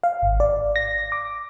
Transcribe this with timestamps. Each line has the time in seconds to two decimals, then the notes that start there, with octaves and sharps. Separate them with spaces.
0.03 F5
0.22 G#1
0.40 D5
0.76 A#6
1.12 D6